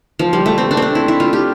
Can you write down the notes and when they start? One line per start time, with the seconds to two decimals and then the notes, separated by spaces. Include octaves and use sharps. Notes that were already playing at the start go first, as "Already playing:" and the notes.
0.19 F3
0.33 G3
0.46 A3
0.58 C4
0.71 D4
0.77 C4
0.82 D4
0.95 E4
1.08 E4
1.20 F4
1.33 G4